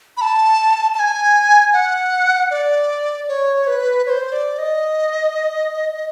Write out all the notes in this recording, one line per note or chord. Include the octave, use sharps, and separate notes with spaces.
B5
A5
A5
G#5
F#5
D5
C#5
B4
C#5
C5
D5
D#5